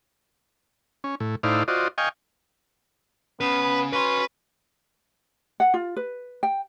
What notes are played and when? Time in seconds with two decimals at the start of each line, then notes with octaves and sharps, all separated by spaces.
1.04 C#4
1.20 A2
1.43 A2 D#4 E4 C5 D5 F5
1.68 F4 F#4 C5 D5 D#5
1.98 D#5 F5 G5 G#5 C#6
3.41 C#3 B3 B4
3.93 C#4 F#4 B4 C6
5.60 F#5
5.74 F4
5.96 B4
6.43 G5